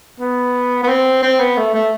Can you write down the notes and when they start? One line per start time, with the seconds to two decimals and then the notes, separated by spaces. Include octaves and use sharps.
0.20 B3
0.83 B3
0.88 C4
1.22 C4
1.39 B3
1.57 A3
1.74 A3